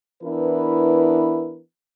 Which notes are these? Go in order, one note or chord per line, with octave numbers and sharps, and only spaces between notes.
E3 B3 D4 E4 A#4 B4